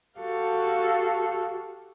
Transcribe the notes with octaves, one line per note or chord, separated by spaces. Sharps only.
F#4 G4 A4 F5